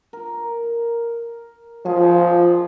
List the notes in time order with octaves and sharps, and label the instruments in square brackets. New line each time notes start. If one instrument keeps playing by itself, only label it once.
[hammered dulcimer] A#4
[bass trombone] F3 [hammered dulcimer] F4 G#4